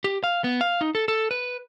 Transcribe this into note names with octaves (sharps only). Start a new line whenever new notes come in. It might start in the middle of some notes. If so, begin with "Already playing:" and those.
G4
F5
B3
F5
D#4
A4
A4
B4